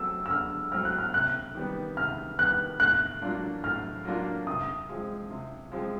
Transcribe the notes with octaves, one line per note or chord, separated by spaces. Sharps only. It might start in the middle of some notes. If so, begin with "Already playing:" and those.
Already playing: F#3 A3 C4 E6
E6
D3 F6
F#3 A3 C4 F6
F#6
F6
C3 F#6
D#3 G3 B3
C3 F6
D#3 G3 B3 F#6
A2 F#6
F#3 A#3 D4 F4
A2 F6
F#3 A#3 D4 F4
C3 D#6
F3 G#3 C4
C3
F3 G#3 C4